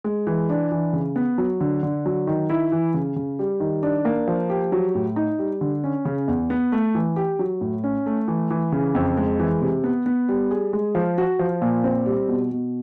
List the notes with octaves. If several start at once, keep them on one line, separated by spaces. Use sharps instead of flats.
G#3
E3
D4
E3
C#3
B3
F#3
D3
D3
F#3
D#3
E4
E3
C#3
C#3
G3
D#3
D4
A#3
F3
G4
F#3
A2
D#4
G3
D3
C#4
C#3
E2
B3
A3
E3
G4
F#3
A2
C#4
A3
E3
E3
C#3
F2
G#3
E3
C3
B3
B3
G3
G#4
G#3
F3
F#4
F3
A#2
C4
G3
B2
B2